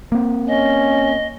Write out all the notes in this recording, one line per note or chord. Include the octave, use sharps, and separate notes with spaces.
A#3 C4
C#4 D#5